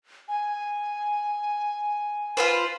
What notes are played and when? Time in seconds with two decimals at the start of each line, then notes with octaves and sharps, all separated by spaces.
0.29 G#5
2.37 F4 B4 C5